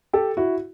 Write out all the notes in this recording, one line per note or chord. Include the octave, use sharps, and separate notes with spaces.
G4 A4
E4 F#4